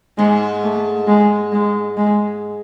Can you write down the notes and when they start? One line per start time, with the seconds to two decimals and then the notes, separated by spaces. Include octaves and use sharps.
0.18 G#2 G#3
0.63 A3
1.08 G#3
1.52 G#3
1.97 G#3